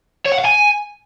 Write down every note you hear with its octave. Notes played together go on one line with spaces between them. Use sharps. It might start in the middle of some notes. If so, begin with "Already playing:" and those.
C#5
F#5
F5
G#5